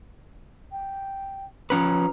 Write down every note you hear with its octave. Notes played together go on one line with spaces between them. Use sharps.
G5
F3 C#4 B4 A#5